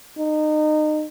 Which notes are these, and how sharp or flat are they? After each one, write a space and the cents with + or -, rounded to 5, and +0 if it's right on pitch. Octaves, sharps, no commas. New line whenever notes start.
D#4 -25